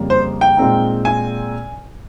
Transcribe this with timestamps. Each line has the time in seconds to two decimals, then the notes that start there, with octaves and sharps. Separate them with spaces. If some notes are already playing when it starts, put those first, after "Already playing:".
Already playing: F2 C#3 G3 A#3
0.10 C5
0.41 G5
0.57 A#2 G#3 C4 D#4
1.05 G#5